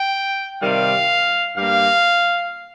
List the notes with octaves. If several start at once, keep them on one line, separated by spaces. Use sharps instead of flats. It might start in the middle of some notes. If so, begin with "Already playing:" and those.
Already playing: G5
C3 D#3 G3 F5
G2 G3 A#3 F5